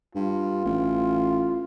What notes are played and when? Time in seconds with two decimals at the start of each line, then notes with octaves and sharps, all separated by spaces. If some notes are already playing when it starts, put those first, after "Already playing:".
0.15 G2 F4
0.65 A1